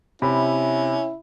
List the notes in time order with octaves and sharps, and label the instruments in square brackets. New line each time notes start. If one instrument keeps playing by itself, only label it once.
[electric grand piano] C3 [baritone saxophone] C#4 [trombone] E4 [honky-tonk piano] B5